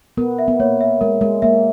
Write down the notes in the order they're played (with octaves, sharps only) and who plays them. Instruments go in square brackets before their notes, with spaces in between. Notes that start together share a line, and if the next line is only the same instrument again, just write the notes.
[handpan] B3 [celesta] A#4
[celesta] E5
[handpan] B3
[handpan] A#3 [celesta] C#5
[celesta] E5
[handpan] G#3 [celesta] A#4
[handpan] G#3 [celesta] A#4
[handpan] A#3 [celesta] E5